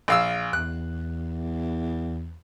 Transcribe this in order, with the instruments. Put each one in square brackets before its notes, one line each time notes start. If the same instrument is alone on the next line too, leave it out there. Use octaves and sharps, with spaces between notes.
[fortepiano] A#1 F5 E6
[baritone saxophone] E2 [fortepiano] F#6